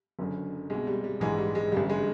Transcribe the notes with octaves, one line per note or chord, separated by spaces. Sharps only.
F#1 F#2 D3
C2 B2 G#3
G3
G3
A#1 G#2 E3 G#3
G3
G#3
A1 G2 D3 G3
G#3